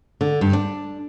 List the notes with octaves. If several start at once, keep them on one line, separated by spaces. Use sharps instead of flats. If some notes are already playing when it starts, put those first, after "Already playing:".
D3
G2
D4